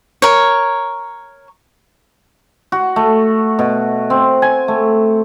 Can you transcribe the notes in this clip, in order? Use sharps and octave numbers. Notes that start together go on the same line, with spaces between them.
A#4 C#5
F#4
A3
B2
C4
G#5
A3